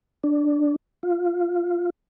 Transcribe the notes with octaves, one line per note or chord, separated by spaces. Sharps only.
D4
F4